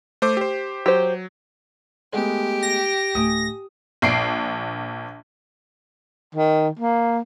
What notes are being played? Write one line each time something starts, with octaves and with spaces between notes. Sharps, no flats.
A3 C5 D6
G4 C5
F#3 G4 C5
G#3 A3 B3 G4
A#6
D1 A3 G#5 D#6
A#1 C7 D7
D#3
A#3